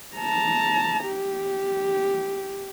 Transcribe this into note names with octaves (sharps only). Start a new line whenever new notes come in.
A5 A#5
G4